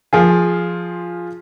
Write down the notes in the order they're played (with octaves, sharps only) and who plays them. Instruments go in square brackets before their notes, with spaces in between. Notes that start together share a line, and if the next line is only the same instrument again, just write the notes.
[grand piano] F3 F4 G#4